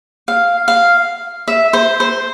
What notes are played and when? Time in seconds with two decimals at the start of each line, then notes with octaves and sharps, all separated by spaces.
0.28 F5
0.68 F5
1.48 E5
1.73 C5
2.00 C5